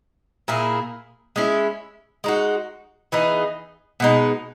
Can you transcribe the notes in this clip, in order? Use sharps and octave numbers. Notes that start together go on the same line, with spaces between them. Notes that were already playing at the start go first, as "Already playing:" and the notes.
A#2 A#3 E4 G#4
G#3 C#4 E4
G#3 D#4 F#4
E3 B3 D#4 G#4
B2 G#3 D#4